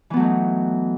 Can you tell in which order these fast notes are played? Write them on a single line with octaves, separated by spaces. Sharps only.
E3 B3 F#3 A3 D#4